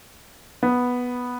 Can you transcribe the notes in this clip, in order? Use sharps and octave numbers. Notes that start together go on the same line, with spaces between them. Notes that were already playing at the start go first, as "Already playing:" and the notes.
B3